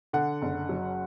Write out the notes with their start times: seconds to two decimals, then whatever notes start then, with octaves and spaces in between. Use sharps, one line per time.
0.13 D3 F#5
0.42 F#1
0.69 F#3